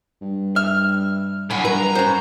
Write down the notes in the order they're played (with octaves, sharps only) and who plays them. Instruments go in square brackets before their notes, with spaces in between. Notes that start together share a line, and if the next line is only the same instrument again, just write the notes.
[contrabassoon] G2
[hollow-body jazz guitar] E5 [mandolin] F6
[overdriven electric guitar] A2 F#3 [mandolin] G#5 B5
[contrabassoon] G2 [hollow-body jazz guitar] A#4 B4 [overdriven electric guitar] A#5
[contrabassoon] F#2 [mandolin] C#4 C5 [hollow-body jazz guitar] F#4